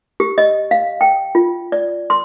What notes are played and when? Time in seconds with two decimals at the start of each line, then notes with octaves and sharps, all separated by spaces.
0.20 G4
0.38 D#5
0.71 F5
1.01 G5
1.35 F4
1.72 D5
2.10 C6